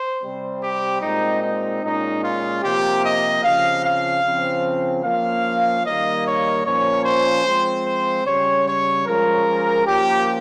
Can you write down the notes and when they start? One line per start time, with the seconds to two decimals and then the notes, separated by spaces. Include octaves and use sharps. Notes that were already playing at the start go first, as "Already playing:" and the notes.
Already playing: C5
0.22 C3 G3 C4
0.62 G4
1.02 A#2 G#3 C4 D#4
1.43 D#4
1.82 A#2 G#3 C#4 D#4
2.22 F4
2.63 C3 F3 A#3 G4
3.03 D#5
3.43 C#3 F3 C4 F5
3.84 F5
4.23 C#3 F3 C4
5.04 F3 A#3 C#4 F5
5.84 D#3 G3 A#3 D#5
6.25 C#5
6.65 A#2 F3 A#3 C#4 C#5
7.05 C5
7.45 F3 G#3 C4
7.86 C5
8.25 C#3 G3 C#4 C#5
8.66 C#5
9.06 F3 G#3 C#4 A#4
9.86 F3 A#3 C#4 G4